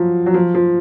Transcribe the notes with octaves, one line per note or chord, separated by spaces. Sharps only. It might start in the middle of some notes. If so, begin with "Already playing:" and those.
Already playing: F3 F#3
F#3
F3
F3